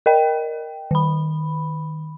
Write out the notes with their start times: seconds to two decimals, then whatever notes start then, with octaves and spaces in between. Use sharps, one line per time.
0.06 A#4 D#5 G5
0.91 D#3 B5